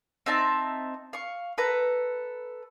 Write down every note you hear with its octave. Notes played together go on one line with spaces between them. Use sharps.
C4 D#4 E5 A5
F5 C#6
A4 B4 A#5